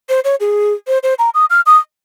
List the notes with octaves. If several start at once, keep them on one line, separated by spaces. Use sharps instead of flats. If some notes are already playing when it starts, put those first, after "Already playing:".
C5
C#5
G#4
C5
C5
A#5
D#6
F6
D#6